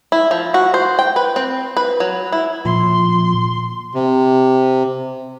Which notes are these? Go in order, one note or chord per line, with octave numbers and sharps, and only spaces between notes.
E4
F3
F#4
C5
G5
B4
C4
B4
F#3
E4
A#2 F3 C6
C3